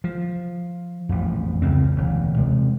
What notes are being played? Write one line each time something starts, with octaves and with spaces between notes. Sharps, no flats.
F3
A1 F2
C#2 C#3 C4
E1 D2
C3 G#3